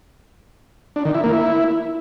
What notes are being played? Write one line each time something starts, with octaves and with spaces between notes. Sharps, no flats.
D4
D#3
E4
A#3
E4